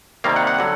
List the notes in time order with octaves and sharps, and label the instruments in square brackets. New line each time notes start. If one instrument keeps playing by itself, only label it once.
[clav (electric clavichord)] C3 D#3 G3 A#3 F5
F#5
F#5
D3 F#3